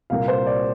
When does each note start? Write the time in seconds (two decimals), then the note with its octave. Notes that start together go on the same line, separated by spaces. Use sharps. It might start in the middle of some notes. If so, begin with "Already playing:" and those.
0.10 C2 A#2 G3 A#3 F5
0.28 C5
0.46 D5